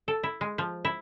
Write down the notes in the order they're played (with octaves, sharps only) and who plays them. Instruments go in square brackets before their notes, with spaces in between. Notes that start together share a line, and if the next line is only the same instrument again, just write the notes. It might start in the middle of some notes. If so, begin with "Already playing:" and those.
[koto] A4
E4
G#3
F3
E4